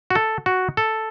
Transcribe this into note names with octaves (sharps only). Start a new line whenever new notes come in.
F#4
A4
F#4
A4